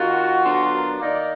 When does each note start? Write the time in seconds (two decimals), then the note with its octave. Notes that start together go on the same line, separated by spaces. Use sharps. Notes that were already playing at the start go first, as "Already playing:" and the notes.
Already playing: D#3 A#3 F4 F#4
0.41 D3 F#3 B3 D4 F4
0.71 A#4
0.99 D#3 A#3 D#4 D5